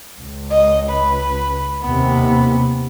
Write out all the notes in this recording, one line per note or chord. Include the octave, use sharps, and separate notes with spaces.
C#2
D#5
B4
D#2 C3 B3